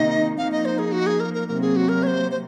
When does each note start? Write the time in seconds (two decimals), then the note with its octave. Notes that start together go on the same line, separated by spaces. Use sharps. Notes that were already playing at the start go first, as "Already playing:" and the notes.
Already playing: C3 D#3 A#3 D#4 D#5
0.37 F3 A#3 D#4 F5
0.52 D#5
0.65 C5
0.79 G#4
0.92 F#4
1.06 G#4
1.20 A#4
1.34 A#4
1.48 C3 F#3 A#3 A#4
1.62 G#4
1.76 F#4
1.89 A#4
2.03 C#5
2.07 C5
2.31 C5